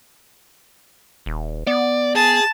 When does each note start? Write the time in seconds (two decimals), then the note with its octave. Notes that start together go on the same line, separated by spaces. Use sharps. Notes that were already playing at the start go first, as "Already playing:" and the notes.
1.26 D#1
1.67 B3 D5
2.15 G#4 A5